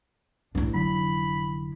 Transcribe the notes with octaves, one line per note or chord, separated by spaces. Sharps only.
A1 D4 E4
F1 D3 F#3 B5